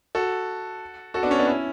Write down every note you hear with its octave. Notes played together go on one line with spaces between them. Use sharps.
F#4 A4
F#4 A4
B3 D4
C#4
B3 D4
C#4 E4